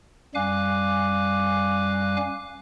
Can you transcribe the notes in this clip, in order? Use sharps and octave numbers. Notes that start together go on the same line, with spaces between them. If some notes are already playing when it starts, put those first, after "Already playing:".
F#2 G3 F5 G#5 D6 F#6